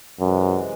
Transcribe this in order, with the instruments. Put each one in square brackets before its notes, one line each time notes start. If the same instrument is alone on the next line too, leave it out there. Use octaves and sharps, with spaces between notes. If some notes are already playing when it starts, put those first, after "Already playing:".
[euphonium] F#2 [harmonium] C3 E3 G#3